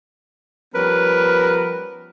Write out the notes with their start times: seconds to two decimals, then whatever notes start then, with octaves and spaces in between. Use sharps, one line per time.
0.75 F3 G3 B3 C#4 A#4 B4